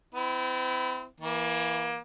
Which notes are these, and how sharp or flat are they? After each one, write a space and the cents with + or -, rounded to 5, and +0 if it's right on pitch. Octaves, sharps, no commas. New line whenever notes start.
C4 -35 E4 +5
E3 +0 A#3 +25